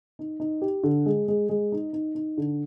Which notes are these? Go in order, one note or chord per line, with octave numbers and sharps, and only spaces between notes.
D#4
D#4
G4
D3
G#3
G#3
G#3
D#4
D#4
D#4
D3